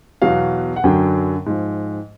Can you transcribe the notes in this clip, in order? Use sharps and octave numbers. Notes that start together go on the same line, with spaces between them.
E2 B2 F#3 F5
F#5
F#2 D3 F#3 G5
G#2 F3